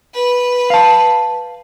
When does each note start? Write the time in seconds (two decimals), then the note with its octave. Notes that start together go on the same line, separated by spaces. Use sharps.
0.14 B4
0.70 F5 A5